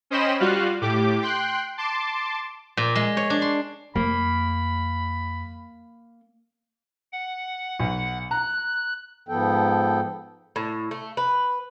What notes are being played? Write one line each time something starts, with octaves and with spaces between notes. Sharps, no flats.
C#4 C5 D#5 G5 B5 E7
G3 F4 F#4 F5 F#6
A2 G4 D6
G5 C6 F#6
A5 C6 D6
A#2
G#3
C#5
D4
C6
F2 A#3 B5
F#5
B1
A#5 F#6
G#2 F3 B3 A4 G5
A2
A3
B4